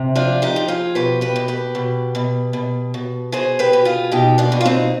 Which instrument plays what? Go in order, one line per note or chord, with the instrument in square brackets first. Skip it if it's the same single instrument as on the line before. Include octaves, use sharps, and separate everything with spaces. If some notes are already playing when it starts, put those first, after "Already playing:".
Already playing: [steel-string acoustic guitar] C3
F3 D4 F4
D#4 G4
F3
F4 G#4
B2 G4 B4
G4 B4
B2
G4 B4
B2
B2
B2
B2
B2 G#4 C5
G4 B4
B2
F4 G#4
B2 D#4 G4
D4 F4
B2
F4
C4 D#4